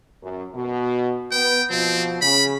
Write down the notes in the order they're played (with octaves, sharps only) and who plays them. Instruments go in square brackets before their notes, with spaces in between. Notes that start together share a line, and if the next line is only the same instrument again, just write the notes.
[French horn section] F#2
B2
[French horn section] B3 [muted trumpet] G5
[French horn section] B2 F3 [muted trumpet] C4
[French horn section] C#3 [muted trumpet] B5